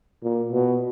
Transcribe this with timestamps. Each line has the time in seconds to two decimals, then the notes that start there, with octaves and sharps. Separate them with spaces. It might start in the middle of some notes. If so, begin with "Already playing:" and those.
0.24 A#2
0.52 B2